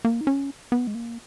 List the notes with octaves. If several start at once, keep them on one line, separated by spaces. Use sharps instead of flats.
A#3
D#4
C#4
B3
G#3
A#3